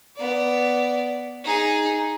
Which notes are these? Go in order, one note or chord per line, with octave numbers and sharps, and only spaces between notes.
B3 D5
D#4 G#4